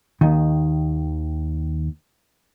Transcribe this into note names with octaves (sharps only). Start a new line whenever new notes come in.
D#2 D#3